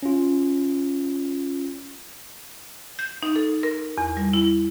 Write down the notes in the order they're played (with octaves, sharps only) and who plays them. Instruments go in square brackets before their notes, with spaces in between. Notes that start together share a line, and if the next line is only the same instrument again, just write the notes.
[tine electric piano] C#4 F4
[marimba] G6
D#4
A4
A#4
E2
G3
E4